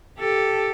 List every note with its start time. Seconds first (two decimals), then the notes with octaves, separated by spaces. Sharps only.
0.19 G4 A4